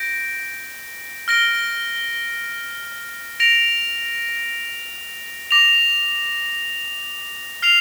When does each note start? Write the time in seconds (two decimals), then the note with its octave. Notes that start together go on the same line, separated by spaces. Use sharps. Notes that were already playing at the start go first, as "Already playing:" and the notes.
Already playing: G6 A#6 D7
1.28 F6 A#6 D7 G7
3.40 A#6 D7 F7
5.51 D6 A#6 F7
7.62 F6 C7 F7